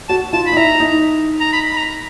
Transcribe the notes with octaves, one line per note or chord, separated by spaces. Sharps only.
F#4 A5
F4 A5
B5
D#4
E4 A#5
D#4
A#5
B5
B5
A#5